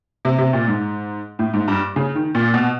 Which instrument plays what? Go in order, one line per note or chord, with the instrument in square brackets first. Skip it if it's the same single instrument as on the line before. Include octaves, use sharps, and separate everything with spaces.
[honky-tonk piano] C3
C3
A#2
G#2
A2
G#2
G2
C#3
D#3
A#2
B2